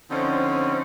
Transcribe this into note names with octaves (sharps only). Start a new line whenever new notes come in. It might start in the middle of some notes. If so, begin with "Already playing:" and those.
D3 F3 C4 C#4 D#4